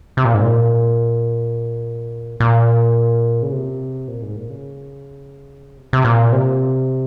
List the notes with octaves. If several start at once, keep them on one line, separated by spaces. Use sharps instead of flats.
C3
A#2
G#2
A#2
A#2
C#3
C3
A#2
G#2
A#2
C#3
C3
C3
A#2
C3